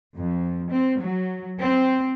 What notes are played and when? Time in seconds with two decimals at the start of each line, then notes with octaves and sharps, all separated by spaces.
0.18 F2
0.71 C4
1.01 F#3
1.59 C4